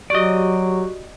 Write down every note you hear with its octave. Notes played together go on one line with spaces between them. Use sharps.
F#3 F#4 G4 D5 D#5 C#6